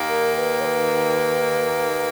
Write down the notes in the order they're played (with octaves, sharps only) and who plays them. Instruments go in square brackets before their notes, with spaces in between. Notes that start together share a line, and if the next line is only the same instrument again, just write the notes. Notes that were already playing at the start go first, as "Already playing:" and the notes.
Already playing: [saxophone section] D#2 D#3 A#3
[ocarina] A#4
B4
C#5
B4